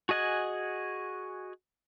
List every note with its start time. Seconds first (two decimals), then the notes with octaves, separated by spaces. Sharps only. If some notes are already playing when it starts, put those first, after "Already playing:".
0.09 F#4 G#4 D#5 F#5 G#5